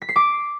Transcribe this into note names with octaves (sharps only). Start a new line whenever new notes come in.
B6
C7
D6